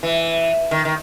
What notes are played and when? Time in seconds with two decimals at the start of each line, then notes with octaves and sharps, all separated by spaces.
0.03 E3
0.71 D#3
0.85 D#3